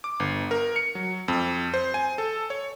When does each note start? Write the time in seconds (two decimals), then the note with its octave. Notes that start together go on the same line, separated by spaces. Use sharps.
0.04 D6
0.20 G1
0.51 A#4
0.76 C#7
0.95 F#3
1.28 F2
1.74 C5
1.94 G#5
2.18 A4
2.50 C#5